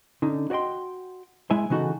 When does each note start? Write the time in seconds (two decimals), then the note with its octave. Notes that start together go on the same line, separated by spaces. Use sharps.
0.22 D3 C#4 D#4
0.50 F#4 C#5 D#5 G5 C6
1.51 G#3 E4 E5 G#5
1.70 C#3 E3 D#4 F#4 A4